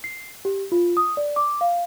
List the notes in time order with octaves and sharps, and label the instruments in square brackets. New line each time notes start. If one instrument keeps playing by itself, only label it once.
[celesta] C7
G4
F4
D#6
D5
D6
F5